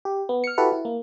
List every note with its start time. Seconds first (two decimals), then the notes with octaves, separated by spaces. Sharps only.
0.05 G4
0.29 B3
0.44 F6 C#7
0.58 E4 F#4 G4 A4 B4
0.72 E4
0.85 A#3